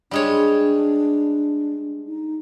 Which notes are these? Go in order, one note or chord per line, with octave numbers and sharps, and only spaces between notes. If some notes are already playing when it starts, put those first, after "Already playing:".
G3 G#3 D4 C#5
D#4